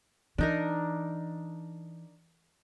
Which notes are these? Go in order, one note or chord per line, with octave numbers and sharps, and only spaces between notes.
E3 D4 D#4 A#4